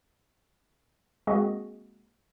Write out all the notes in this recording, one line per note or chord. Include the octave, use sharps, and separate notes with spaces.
G#3 A#3 C4 F#4 G#4 D#5